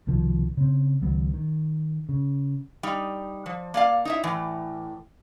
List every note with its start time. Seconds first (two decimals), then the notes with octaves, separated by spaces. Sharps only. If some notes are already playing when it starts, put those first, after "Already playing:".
0.07 C2 B2 D#3 F3
0.57 C#3 C4
1.01 C#2 D#3 F#3 B3
1.34 D#3
2.09 C#3
2.83 G3 D#4
3.46 F3
3.74 A#3 D5 F5
4.05 D#4 E4 E5
4.23 A2 E3